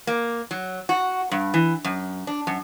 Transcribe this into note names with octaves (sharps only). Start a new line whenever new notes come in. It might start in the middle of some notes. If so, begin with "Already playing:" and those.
A#3
F#3
F#4
G2
E3
F#2
D4
F#2